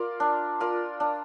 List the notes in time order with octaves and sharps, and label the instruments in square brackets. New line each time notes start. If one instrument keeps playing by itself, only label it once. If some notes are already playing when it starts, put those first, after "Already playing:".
Already playing: [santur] F4 A#4 D5
D4
F4 A#4 D5
D4